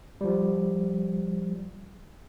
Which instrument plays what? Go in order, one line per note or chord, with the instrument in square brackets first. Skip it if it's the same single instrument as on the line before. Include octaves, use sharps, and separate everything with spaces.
[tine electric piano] F3 G3